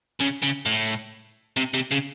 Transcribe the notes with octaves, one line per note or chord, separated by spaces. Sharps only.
C#3
C#3
A2
C3
C3
C#3